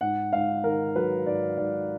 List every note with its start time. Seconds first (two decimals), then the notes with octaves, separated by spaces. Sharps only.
0.01 G#2 F#5
0.33 G#2 F5
0.64 D#3 A#4
0.95 F#3 B4
1.27 G#2 D5
1.57 G#2 D5